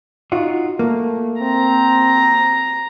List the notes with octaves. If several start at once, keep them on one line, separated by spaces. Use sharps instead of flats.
D#4 F4 F#4
A3 A#3
C4 A#5